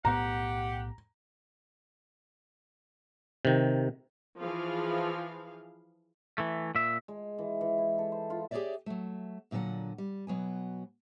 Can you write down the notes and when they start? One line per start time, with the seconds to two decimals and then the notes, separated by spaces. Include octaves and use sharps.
0.05 B1 A2 B3 G4 F#5 A#5
3.45 C3 D#3
4.39 E3 F3 G#4 F5
6.38 E3 A3
6.75 A#2 E5
7.08 G#3
7.38 E3
7.61 E3
7.78 E4
7.98 A4
8.12 C5
8.30 F4
8.51 G4 G#4 B4 C#5 D5 E5
8.86 F#3 A3
9.51 F#2 A#2 D3 F#3 F#5
9.98 G3
10.27 B2 F#3 B3 G#5